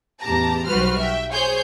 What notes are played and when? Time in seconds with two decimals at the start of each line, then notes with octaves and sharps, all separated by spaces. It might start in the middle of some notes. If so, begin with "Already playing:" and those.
0.21 A1 E2 G4 A5 A#5
0.66 B1 G3 F#4 B4 C5 F6
0.99 E5 G5
1.33 G#4 C5 C#5 G#5 C6 G6